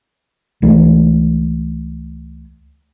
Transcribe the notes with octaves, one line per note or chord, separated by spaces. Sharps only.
C#2 E3 A3